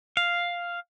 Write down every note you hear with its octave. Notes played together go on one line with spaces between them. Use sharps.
F5